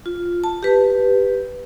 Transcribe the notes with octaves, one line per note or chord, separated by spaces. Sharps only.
F4
A5
G4 B4